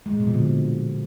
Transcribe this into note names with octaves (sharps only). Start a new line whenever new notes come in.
G#3
A#2
B2
F3
D3